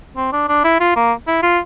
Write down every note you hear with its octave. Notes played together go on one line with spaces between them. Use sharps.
C4
D4
D4
E4
F4
A#3
E4
F4